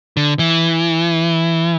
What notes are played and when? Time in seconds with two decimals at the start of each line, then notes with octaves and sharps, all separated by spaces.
0.17 D3
0.39 E3